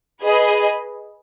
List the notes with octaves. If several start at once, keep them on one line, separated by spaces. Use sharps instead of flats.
G#4 B4 D#5